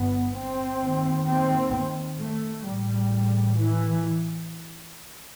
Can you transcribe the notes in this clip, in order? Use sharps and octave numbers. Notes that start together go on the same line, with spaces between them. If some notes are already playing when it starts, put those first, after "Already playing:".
Already playing: G1 G2 B3
C4
D#2
C4
A3
A1 A2 G3
E3